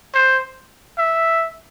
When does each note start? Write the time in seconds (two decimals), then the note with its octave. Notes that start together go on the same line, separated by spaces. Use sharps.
0.14 C5
0.98 E5